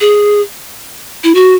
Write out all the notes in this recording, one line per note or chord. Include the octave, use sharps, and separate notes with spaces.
G#4
E4
F#4